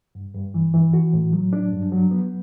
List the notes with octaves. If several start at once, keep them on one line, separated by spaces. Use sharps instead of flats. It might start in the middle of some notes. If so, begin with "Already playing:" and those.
G2
G2
E3
E3
F#4
A2
F#3
D4
G2
F#3
B3